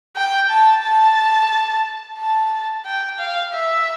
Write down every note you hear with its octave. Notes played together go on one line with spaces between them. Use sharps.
G5
A5
A5
A5
G5
F5
E5